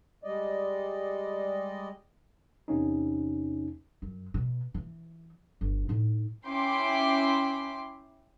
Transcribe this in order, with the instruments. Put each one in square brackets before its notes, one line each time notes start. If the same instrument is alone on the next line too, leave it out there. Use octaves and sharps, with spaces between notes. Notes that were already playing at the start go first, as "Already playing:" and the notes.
[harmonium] G3 G#3 D5 D#5
[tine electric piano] E2 C3 A#3 C#4 D#4
[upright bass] F#2
B2
E3
G1
A2 D#4
[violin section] C#4 E4 G5 C6 D6